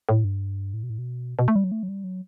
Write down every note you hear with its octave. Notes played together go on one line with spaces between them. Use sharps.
A2
G2
A2
B2
A2
B2
B2
A3
G3
F#3
A3
F#3
G3
F#3